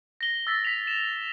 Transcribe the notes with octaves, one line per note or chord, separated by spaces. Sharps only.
A#6 G7
E6 A6 B6
B6 F7
E7